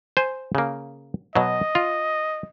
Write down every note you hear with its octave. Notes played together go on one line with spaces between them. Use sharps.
C5 G#5
C#3 A#3
B2 F#3 D#5
F4